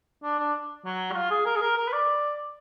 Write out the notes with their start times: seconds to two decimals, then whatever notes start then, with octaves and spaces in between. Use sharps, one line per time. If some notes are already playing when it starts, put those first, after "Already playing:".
0.23 D4
0.39 D4
0.85 F#3
1.11 F#4
1.15 F4
1.30 G#4
1.46 A#4
1.56 G#4
1.61 A#4
1.77 A#4
1.88 B4
1.92 D5